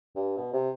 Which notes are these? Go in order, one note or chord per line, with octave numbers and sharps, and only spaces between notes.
G2
B2
C3